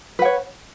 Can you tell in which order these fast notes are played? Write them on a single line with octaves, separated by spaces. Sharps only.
B4 F#5 C#5